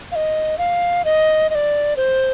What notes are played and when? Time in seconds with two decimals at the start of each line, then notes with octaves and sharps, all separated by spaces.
0.12 F5
0.16 D#5
0.58 F5
1.05 D#5
1.50 D#5
1.55 D5
1.97 C5